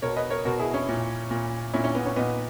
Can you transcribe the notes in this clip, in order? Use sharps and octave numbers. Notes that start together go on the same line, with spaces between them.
B2 A#4 C#5
B4 D#5
A#4 C#5
B2 F#4 A#4
E4 G#4
C#4 E4
A#2
A#2
A#2 C#4 E4
C#4
B3
C#4
A#2 B3 D#4